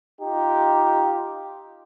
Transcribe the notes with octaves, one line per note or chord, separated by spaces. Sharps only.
D#4 F4 G4